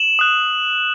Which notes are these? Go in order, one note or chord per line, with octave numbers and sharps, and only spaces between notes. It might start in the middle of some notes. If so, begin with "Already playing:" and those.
Already playing: E7 F#7
D#6 F#6